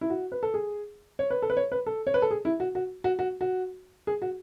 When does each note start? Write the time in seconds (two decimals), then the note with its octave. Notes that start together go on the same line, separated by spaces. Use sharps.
0.01 E4
0.10 F#4
0.32 B4
0.43 A4
0.54 G#4
1.19 C#5
1.30 B4
1.42 A4
1.50 B4
1.57 C#5
1.72 B4
1.86 A4
2.07 C#5
2.14 B4
2.22 A4
2.31 G#4
2.45 E4
2.60 F#4
2.75 F#4
3.04 F#4
3.19 F#4
3.41 F#4
4.07 G#4
4.22 F#4